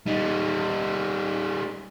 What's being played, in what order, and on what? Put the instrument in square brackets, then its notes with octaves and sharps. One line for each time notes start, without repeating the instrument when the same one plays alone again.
[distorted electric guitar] G3 D#4